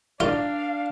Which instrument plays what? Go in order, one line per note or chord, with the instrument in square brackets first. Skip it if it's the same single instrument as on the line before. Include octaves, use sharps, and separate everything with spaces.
[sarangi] D4 [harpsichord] F4 [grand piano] A#4 D5 [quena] F5